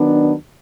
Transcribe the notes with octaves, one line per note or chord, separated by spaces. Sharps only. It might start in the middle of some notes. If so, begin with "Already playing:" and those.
Already playing: D#3 F#3 B3 D4